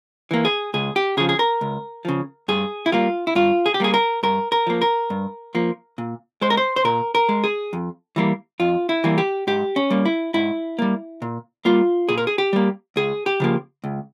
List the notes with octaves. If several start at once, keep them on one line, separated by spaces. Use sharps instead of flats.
E3 A#3
G#4
C#2 G#4
G4
C#3 F3 G#4
G#4
A#4
C#2
C#3 F3
G2 G#4
E4
G3 A#3 F4
E4
G2 F4
G#4
G4
G3 A#3 G#4
A#4
G2 A#4
A#4
F3 A#3
A#4
G2
F3 A#3
A#2
G#3 C5
A#4
C5
C5
A#2 A#4
A#4
G#3
G#4
F2
E3 G3 A#3
F2 F4
E4
E3 G3 A#3
G4
G#2 G4
C#4
G3 A#3
E4
G#2 E4
G3 A#3
A#2
G3 A#3 F4
A#2 G#4
A#4
G#4
G4
G3 A#3
C#2 G#4
G4
C#3 F3 A#3
C#2